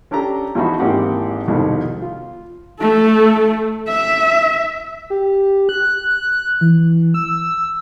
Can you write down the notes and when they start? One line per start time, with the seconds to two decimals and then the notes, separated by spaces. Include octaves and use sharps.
0.11 C#4 D4 G4 A4 A#5
0.55 E2 F3 D#4 F#4 E5 B5
0.79 G#1 E3 A#3 C4 G4 F#5
1.48 C2 F2 B2 D#3
2.01 F4
2.81 A3 A4
3.88 E5
5.10 G4
5.69 F#6
6.61 E3
7.14 E6